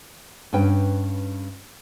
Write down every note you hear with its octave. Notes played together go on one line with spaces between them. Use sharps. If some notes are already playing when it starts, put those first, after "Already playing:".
G2 C#4 B4 G5